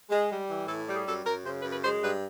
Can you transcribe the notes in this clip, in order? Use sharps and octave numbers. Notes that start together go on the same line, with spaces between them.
G#3
G3
E3
A2 A4
G3 G4
G#4
F#2 A4
F#2 A#4
C#3 C5
B4
F#2
B4
G#3 C5
G2 B4